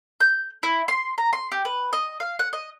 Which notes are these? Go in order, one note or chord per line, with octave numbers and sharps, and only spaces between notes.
G6
E4
C6
A#5
C6
G4
B4
D#5
F5
F#5
D#5